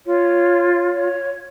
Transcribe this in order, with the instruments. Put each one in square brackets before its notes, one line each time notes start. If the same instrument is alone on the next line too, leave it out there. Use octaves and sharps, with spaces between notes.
[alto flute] F4 [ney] C#5
[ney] C#5